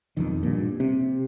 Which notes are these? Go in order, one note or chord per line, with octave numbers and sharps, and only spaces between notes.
E1 F2 D#3
G2 A#2
C3